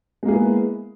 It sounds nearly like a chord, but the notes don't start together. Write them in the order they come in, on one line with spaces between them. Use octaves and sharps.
G#3 A#3 G#4 E4 B3